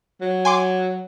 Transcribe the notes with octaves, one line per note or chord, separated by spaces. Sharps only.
F#3
G#5 C6 D6